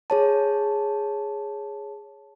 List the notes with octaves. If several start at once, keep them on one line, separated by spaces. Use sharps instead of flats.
G#4 C#5 A5